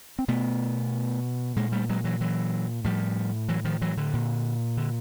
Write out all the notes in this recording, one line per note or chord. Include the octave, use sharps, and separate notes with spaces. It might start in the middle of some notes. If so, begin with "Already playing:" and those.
C4
B2 A3 B3
A#2 G#3 A#3
G3 A3
F#3 G#3
E3 F#3
E3 F#3
A2 F3 G3
E3 F#3
D#3 F3
E3 F#3
D3
A#2
D3